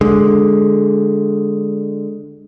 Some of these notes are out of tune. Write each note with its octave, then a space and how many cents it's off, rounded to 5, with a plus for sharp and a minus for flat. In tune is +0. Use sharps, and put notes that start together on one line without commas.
D3 +0 G#3 +0